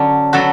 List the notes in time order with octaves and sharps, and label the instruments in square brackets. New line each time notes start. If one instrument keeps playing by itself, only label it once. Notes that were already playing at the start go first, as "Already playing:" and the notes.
Already playing: [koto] D3 F#3 C#4
F#3 B3 F#4 A4